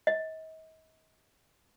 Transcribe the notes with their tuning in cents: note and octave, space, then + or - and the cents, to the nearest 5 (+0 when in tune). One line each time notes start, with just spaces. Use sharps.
D#5 +40